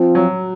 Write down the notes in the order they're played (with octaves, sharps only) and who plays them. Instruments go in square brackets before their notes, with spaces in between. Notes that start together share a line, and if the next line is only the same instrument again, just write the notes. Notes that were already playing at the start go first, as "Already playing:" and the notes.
Already playing: [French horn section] F3 C4 F4
[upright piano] F#3